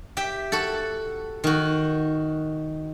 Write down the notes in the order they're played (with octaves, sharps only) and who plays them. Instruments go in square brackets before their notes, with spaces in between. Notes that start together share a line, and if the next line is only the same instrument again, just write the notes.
[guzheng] G4 E5 G5
F#4 A4
D#3 F#4